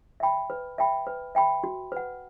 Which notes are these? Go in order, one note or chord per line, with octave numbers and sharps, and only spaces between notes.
E5 G5 B5
B4
E5 G5 B5
B4
E5 G5 B5
F#4
B4 F#5